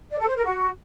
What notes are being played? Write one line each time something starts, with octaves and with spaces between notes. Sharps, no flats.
D5
A4
C5
A#4
F#4